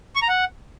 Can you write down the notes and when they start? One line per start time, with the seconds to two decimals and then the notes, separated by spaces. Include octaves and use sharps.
0.16 C#6
0.22 A#5
0.29 F#5